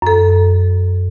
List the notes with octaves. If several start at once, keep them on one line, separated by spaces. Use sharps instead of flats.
F#2 A4